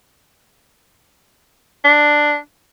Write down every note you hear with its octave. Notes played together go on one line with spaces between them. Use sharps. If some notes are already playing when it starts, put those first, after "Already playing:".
D4